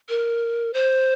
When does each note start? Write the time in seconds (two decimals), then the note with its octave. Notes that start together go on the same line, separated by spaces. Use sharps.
0.09 A#4
0.74 C5